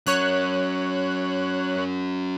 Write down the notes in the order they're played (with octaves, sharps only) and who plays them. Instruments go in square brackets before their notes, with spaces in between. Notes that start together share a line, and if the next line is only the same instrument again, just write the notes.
[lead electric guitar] F#3 C#4 [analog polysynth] C#5 F#6